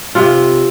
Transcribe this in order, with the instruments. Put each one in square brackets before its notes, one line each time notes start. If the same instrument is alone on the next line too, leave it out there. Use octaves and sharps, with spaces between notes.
[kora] C3 F4